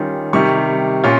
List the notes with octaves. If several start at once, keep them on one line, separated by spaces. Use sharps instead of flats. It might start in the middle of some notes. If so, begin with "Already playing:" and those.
Already playing: D#3 G3 C#4 F4
C3 D#3 G3 C#6
A#2 C#4 F4 C#6